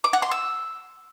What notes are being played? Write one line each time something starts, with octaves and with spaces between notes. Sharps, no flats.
D6
F#5
C6
E6